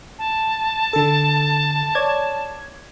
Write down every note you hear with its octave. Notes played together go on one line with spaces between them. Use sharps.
A5
D3 A4
C#5 D5 G#6